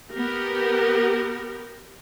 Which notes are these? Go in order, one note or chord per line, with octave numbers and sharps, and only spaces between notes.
B3 G4 A#4